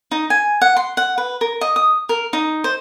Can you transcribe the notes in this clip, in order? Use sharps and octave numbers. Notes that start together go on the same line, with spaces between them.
D#4
G#5
F#5
C6
F#5
B4
A#4
D#5
D#6
A#4
D#4
C5